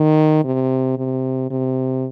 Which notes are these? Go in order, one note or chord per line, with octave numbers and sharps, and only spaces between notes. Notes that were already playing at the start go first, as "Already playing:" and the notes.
Already playing: D#3
C3
C3
C3